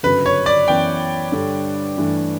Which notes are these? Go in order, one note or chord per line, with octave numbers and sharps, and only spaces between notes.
G1 F#2 C#3 F#3 B4
C#5
D5
F#2 E3 B3 G5
G2 D3 G3 D4 A4
G2 E3 A3 D4